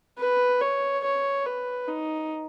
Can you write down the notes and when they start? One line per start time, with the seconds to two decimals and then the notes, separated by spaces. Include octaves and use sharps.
0.19 B4
0.61 C#5
1.04 C#5
1.46 B4
1.88 D#4